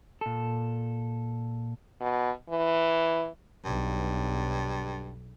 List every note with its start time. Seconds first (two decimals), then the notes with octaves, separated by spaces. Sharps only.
0.21 A#2 A4
2.01 B2
2.49 E3
3.65 B1 G2